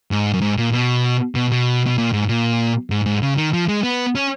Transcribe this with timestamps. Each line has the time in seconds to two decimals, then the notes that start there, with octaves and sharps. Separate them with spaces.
0.11 G#2
0.33 F#2
0.41 G#2
0.58 A#2
0.72 B2
1.35 B2
1.51 B2
1.86 B2
1.98 A#2
2.13 G#2
2.28 A#2
2.90 G#2
3.06 G#2
3.22 C#3
3.37 D#3
3.53 F3
3.69 G#3
3.83 B3
4.15 C#4